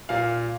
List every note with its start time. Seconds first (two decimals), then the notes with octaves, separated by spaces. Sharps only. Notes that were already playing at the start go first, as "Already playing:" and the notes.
0.09 A#2 F5